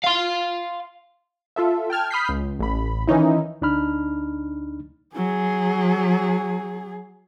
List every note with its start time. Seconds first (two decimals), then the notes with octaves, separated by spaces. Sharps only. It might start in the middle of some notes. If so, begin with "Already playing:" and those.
0.04 F5 C6
1.56 F4 A4 E5
1.90 G5 A5 F6 G#6
2.11 B5 D#6 F6 G6 B6 C7
2.29 C#2
2.59 A1 B5
3.08 D#3 E3 C#4 D#4 E4
3.62 D2 D4 D#4 B5 F6
5.15 F#3 G#4